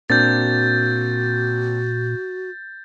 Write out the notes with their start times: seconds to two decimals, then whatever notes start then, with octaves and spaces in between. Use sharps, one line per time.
0.10 A#2 A#3 C4 D4 F#4 G6 A6